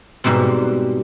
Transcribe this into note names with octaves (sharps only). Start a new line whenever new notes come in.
G#2 B2 G3 C4